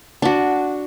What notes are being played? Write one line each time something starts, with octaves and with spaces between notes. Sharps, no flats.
D4 F#4